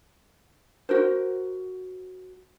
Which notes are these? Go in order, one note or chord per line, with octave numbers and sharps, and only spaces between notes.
F#4 A#4 C5